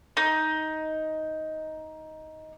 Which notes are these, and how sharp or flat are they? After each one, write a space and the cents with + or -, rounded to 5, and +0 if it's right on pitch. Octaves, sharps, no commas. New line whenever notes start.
D#4 +10